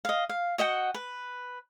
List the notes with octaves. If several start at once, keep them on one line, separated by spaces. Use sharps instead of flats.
D#5 F5
F5
F#4 D#5 F#5 G5
B4